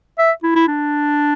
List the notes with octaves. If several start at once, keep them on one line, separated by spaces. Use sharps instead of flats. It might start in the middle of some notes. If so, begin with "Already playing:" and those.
E5
E4
E4
D4